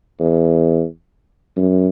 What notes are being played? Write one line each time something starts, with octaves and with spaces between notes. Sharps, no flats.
E2
F#2